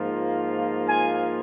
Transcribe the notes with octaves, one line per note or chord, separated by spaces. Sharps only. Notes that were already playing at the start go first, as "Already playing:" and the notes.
Already playing: G#2 F3 A#3 F4
G#5